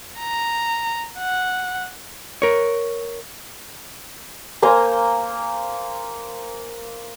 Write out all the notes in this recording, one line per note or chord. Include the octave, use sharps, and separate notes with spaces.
A#5
F#5
A#4 C#5
A#3 C5 G#5 A#5